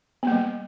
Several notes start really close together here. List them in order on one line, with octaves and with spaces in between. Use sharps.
B3 A#3 G3